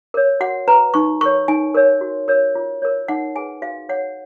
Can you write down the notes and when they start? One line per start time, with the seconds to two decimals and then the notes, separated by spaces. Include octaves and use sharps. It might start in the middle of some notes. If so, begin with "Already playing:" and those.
0.14 A#4 C#5
0.40 F#4 F#5
0.68 B4 A#5
0.94 D#4 C#6
1.21 A#4 C#6
1.25 C#5
1.48 D#4 G#5
1.75 A#4 C#5
2.01 F#4
2.28 A#4 C#5
2.55 F4
2.82 A#4 C#5
3.08 D#4 F#5
3.35 G#4 B4 G#5
3.62 F#4 F5
3.89 C#5 F#5